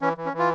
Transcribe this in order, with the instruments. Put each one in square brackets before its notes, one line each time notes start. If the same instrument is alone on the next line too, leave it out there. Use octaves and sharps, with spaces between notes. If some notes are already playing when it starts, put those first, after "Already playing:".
[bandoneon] E3 C#4
E3
C#4
E3
F4